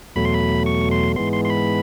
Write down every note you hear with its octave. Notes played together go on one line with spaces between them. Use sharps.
E2 B2 F#3 A3 B5
C6
B5
C#6
C6
G#2 E3 G#3 B3 C6
C6
C6
B5